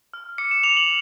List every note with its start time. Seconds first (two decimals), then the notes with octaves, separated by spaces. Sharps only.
0.14 F6
0.38 D6 C#7
0.51 E7
0.63 D6 F7
0.77 F#7